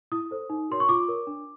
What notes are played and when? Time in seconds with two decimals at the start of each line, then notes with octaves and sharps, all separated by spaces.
0.12 E4 D#6
0.31 A4 C5
0.50 D#4
0.69 F#4 A#4 C#5 C6
0.80 C#6
0.89 F4 D6
1.08 A#4 C#5
1.27 D4